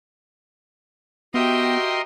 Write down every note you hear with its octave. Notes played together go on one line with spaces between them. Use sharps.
B3 F#4 G4 A#4 D#5 E5 G5 C6